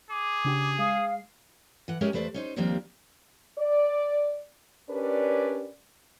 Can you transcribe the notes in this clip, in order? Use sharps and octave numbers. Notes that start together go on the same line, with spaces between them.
G#4 D6
C#3 D4 G4
G#3 F5 D#6 C7
E3 F#5
G#3 C#4 G4 G#4 A#4 E5
E2 A3 B4 C5 D5
C#4 D#4 C5
D#2 F3 G3 A#3 C4 D4
D5
C#4 D4 G4 A#4 B4 D5